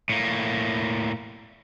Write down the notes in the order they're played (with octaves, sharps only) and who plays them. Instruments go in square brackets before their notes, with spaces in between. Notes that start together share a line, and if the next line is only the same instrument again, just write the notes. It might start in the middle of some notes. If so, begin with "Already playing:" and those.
[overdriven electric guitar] A2 A#3